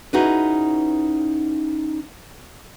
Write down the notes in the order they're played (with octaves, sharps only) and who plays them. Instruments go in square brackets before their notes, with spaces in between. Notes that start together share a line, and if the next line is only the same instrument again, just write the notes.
[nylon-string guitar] C#4 D#4 E4 F#4 G#4 B4